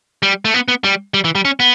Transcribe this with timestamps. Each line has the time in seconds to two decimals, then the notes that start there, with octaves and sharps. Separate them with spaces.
0.23 G3
0.45 A3
0.54 B3
0.68 B3
0.84 G3
1.14 G3
1.25 E3
1.35 G3
1.45 C#4
1.60 B3